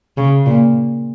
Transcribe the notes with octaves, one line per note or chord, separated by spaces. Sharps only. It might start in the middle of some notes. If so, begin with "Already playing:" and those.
C#3
A#2